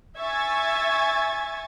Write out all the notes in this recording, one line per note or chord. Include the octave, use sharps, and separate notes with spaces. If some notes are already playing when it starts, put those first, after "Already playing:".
E5 G#5 C#6 G#6 A6